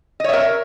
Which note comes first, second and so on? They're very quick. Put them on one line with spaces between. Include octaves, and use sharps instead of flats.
D#5 C#5 E5 A#4